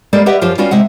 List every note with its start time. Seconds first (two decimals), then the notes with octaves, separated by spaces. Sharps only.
0.13 G3 G#3 A#3 A4 C5 D5
0.26 G4 B4 D#5 E5 F#5
0.41 F#2 F3 F4 G4 C5 F5
0.58 G3 B3 C#4 F4 F#4 F5
0.71 C3 G#3 E5 F#5